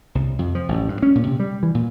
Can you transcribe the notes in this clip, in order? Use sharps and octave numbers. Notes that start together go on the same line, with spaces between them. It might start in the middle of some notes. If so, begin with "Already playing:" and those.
C2
F2
F3
A1
G2
C#4
A#2
C3
G3
E3
A#2